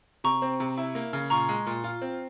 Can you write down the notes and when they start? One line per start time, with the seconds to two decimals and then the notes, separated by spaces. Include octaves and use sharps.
0.24 C3 A#5 C#6
0.42 C4
0.60 C3
0.77 E4
0.95 A#3
1.13 C#3
1.30 A#2 A#5 C#6
1.49 G#3
1.66 A#2
1.84 F4
2.02 C4